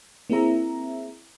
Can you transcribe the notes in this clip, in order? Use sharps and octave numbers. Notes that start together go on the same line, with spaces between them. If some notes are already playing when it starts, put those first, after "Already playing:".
A#3 C4 E4 G#4 E5 A#5